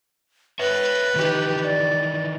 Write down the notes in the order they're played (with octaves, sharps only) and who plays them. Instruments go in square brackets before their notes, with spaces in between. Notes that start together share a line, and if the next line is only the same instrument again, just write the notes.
[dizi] B4 [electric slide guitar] C#5 E5
[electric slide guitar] D#3 E3 D#4 [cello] G4
[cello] D5